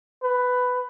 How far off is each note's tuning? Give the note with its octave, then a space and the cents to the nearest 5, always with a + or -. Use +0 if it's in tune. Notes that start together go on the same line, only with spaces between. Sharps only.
B4 +10